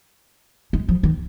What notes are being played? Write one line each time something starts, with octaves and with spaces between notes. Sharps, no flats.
G#3
F3
D#3